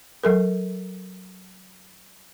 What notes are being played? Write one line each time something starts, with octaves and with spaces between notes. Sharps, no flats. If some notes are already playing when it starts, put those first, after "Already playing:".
F#3 A4 A#4